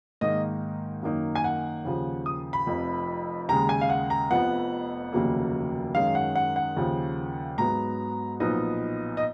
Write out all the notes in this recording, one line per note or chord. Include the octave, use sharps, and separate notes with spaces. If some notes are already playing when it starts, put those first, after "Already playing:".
G#2 D#3 A#3 D#4 D#5
F#2 D#3 A#3 D#4
G#5
F#5
D#2 C#3 F3
D#6
B5
F1 F2 F3
D#2 C#3 G#3 A#5
G#5
F5
F#5
A#5
F1 F2 F3 B3 F#5
F1 D#2 C#3 F#3 A#3
F#2 D#3 G#3 C#4 F5
F#5
F#5
F#5
D#2 C#3 F3
G#2 F#3 B3 A#5
B1 A#2 F3 B3 D#4 D#5
D#5